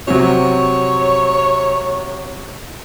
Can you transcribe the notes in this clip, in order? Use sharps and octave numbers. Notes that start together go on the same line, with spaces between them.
C3 F#3 C#5